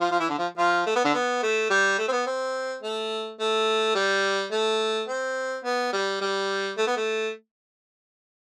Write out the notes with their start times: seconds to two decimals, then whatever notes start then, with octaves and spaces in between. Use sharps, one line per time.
0.01 F3 F4
0.11 F3 F4
0.20 E3 E4
0.29 D3 D4
0.38 F3 F4
0.57 F3 F4
0.86 A3
0.96 B3
1.04 D3 D4
1.14 B3
1.43 A3
1.70 G3
1.98 A3
2.08 C4
2.12 B3
2.26 C4
2.83 A3
3.40 A3
3.95 G3
4.52 A3
5.08 C4
5.65 B3
5.93 G3
6.21 G3
6.78 A3
6.87 B3
6.97 A3